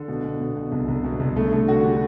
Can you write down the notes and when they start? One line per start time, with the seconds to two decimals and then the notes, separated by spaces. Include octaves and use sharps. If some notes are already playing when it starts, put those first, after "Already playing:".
Already playing: D3
0.08 B2
0.24 B2
0.40 B2
0.57 B2
0.72 C2
0.88 C2
1.04 B2
1.20 C2
1.36 D3 A3
1.52 D3 A3
1.68 D3 F#4
1.84 D3 G4